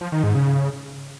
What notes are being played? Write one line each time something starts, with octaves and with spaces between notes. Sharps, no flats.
F3
D#3
G#2
C#3